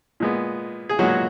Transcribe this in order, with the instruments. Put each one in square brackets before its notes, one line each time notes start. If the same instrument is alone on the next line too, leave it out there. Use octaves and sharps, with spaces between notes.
[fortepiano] A#2 G#3 B3
G#4
A#2 F#3 G#3 B3 F#4